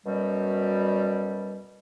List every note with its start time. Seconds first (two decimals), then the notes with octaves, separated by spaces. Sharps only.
0.06 F#2 B2 G3